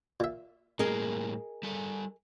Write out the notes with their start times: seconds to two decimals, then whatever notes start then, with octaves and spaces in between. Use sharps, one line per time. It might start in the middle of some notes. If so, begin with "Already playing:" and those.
0.20 A#2 E5
0.79 A2 G3 A#3 G#4 A#4 D#5
1.63 G3 A4